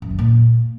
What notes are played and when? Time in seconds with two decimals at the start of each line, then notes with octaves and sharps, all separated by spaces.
0.02 F#2
0.10 D3
0.19 A#2